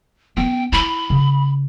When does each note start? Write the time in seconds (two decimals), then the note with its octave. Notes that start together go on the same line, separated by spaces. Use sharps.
0.37 B3 C#4 G5
0.72 E4 B5
1.10 C#3